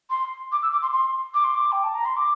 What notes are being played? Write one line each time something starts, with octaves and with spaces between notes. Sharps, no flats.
C6
D6
E6
D6
C6
C6
D6
C6
D6
G5
A5
A#5
C6
D6